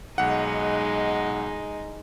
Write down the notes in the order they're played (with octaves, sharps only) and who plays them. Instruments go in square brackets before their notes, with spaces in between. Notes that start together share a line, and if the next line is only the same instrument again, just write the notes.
[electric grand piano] B1 F#5 [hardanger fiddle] G#3 D#4